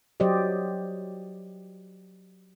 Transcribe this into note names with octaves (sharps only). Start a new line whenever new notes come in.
F#3 G4 C5 D5 D#5